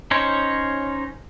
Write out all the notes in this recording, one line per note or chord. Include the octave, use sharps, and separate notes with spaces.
C#4 D#4 C5 C#5